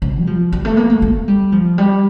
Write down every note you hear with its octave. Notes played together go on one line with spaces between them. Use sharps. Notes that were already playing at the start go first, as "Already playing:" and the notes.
C#3
G3
F3
G3
A3
A#3
A3
A3
G3
F3
G3